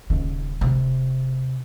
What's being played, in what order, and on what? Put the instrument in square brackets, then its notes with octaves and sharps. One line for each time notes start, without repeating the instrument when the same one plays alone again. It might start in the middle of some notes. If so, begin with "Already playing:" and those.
[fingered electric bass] D#1 D#2 [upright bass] C#3
[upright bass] C3